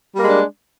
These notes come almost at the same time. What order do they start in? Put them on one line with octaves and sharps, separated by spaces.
G3 A#3 G#3 D4